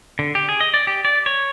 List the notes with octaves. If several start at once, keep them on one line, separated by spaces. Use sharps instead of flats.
D3
G4
G#4
D#5
D5
G4
D5
C#5